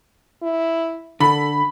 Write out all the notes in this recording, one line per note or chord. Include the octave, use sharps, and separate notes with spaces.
E4
D3 A4 B5